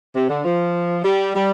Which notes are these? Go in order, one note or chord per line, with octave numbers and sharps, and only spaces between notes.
C3
D3
F3
G3
G3